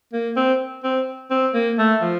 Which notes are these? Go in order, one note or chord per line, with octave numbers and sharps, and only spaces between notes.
A#3
C4
C4
C4
A#3
A3
F3